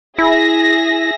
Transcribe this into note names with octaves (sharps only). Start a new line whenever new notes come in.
E4 G#4 E5 A#6